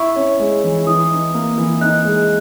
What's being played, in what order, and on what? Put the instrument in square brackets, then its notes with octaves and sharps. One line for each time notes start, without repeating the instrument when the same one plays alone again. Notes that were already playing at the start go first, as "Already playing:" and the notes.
Already playing: [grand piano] E4 [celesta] C#6
[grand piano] C#4
G#3
E3
[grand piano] E3 [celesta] D#6
[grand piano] D#4
A#3
E3
[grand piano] D#4 [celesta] F#6
[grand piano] G#3